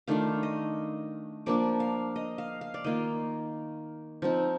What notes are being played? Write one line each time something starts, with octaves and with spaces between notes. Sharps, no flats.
D#3 A3 D4 F4 F5
D#5
F3 A#3 D4 D5
F5
D#5
F5
F5
D5
D#3 A#3 F4 D#5
F3 C4 D#4